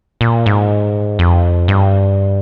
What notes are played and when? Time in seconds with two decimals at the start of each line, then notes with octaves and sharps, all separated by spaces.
0.21 A#2
0.46 G#2
1.19 F2
1.68 G2